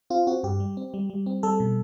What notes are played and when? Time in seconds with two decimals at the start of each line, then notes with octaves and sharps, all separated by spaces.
0.10 C4 F4
0.27 C4 F#4
0.43 G2 G4
0.60 G3
0.77 C4
0.94 G3
1.10 G3
1.26 C4
1.43 G3 A4
1.60 B2